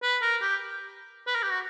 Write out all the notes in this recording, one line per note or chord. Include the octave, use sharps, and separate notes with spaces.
B4
A#4
G4
B4
A#4
G4
F#4